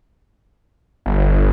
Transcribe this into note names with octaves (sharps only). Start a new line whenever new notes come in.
G1